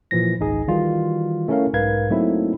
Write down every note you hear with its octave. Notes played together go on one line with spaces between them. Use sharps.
A#2 E3 F3 A#6
G#1 C#2 D#4 G#4
D#3 E3 G3 F4 F#4
A3 C#4 E4 A#4 C#5 F5
B1 G#2 A#4 B4 F5 G#6
F#3 A3 A#3 C4 D#4 E4